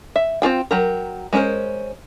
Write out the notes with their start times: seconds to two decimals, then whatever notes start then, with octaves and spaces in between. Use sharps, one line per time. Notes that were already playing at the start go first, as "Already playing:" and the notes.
0.16 E5
0.42 C4 F4 G#4 G5
0.71 F#3 G4 A#4
1.33 G#3 C#4 E4 A#4 C5